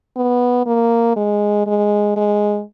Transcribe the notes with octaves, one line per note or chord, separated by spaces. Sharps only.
B3
A#3
G#3
G#3
G#3